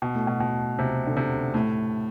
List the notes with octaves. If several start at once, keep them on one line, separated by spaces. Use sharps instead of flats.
B2
A2
B2
B2
C3
D3
C3
A2